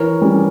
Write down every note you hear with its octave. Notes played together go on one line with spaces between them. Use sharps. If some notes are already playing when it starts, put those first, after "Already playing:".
Already playing: E3 A#4 C#5
G3 C#4